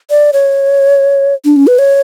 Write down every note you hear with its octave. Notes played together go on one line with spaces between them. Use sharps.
D5
C#5
D4
C#4
B4
C#5